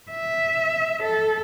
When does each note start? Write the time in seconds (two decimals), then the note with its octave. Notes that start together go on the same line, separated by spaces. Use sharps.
0.11 E5
1.02 A4